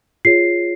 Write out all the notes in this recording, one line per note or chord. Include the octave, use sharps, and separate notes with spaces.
F4 G#4 C#5 C7